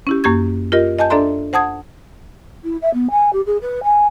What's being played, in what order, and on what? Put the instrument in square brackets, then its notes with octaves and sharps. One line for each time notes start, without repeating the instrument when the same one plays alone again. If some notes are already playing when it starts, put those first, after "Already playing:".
[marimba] C#4 E4 G4
F#2 A#3 G4 C#6 G#6
F4 G4 A#4 D#5
D#5 G#5 A5 G6
D4 A4 D5 E5 A#5 C6
C5 F#5 A5 D#6 G#6
[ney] E4
E5
B3
G#5
G4
G#4
B4
G#5